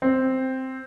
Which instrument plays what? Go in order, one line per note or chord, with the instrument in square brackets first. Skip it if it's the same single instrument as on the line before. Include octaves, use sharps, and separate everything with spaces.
[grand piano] C4